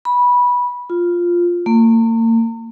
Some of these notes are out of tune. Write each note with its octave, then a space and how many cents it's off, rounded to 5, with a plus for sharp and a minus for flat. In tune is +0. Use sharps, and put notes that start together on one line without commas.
B5 -15
F4 +0
A#3 -40